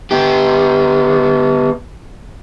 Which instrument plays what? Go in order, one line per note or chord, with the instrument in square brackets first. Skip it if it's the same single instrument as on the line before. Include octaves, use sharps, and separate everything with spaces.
[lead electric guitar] B3 G4